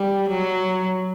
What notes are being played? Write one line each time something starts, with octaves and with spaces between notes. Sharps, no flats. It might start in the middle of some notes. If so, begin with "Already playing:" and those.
Already playing: G3
F#3